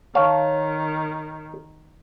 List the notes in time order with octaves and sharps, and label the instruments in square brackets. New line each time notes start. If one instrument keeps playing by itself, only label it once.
[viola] D#3 [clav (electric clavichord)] C#5 F5 A5